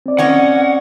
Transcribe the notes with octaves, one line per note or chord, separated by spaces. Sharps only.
C4 D5
C#4 C#5 D#5 F#5